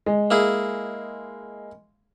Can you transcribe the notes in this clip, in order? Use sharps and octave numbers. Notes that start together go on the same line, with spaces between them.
G#3
A#3 E4 G#4